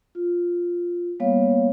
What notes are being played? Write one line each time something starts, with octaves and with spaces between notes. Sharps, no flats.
F4
G3 A#3 B3 C#5 F5